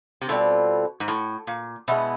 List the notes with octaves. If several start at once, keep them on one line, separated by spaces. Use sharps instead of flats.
C3
B2 G3 C4 F4 A4
G#2
A2
A#2
B2 G#3 B3 E4